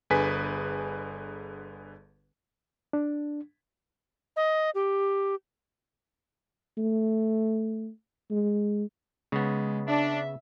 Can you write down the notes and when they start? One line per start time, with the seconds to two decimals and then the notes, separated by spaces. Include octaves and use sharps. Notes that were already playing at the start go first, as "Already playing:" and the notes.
0.10 G1 D3 G#4 B4 G#5 B6
2.93 D4
4.36 D#5
4.75 G4
6.78 A3
8.31 G#3
9.32 C#3 G#3 B3
9.88 D4 E5